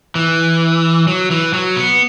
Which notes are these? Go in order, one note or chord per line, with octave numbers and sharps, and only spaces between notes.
E3
F#3
E3
F#3
B3